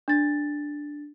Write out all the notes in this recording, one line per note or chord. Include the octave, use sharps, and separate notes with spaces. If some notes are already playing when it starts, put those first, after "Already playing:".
D4 A6